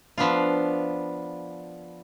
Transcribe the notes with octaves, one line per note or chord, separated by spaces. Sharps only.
F3 B3 D4 F4